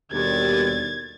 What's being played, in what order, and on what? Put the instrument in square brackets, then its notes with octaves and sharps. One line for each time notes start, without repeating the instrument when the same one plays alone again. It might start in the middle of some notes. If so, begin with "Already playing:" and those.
[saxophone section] D#2 [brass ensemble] B2 D3 G3 [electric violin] G#6 A6